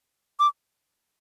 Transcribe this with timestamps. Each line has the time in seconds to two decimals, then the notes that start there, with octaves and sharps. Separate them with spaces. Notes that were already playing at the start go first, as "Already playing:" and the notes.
0.40 D6